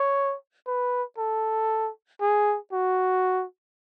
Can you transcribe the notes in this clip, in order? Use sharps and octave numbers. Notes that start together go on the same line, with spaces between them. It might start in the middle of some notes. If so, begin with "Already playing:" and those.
Already playing: C#5
B4
A4
G#4
F#4